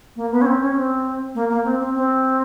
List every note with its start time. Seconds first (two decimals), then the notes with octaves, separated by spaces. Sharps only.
0.16 A#3
0.31 B3
0.41 C#4
0.46 C4
0.60 C#4
0.76 C4
1.35 A#3
1.50 A#3
1.65 C4
1.80 C4
1.94 C4